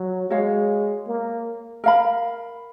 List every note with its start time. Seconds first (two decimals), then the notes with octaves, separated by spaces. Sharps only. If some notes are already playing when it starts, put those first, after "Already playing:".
Already playing: F#3
0.30 G#3 F#4 C#5 F5
1.07 A#3
1.84 A#4 F5 B5